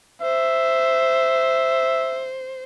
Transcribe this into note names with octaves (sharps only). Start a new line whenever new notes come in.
C5 E5